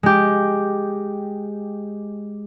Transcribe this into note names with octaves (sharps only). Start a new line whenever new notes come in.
G#3 G4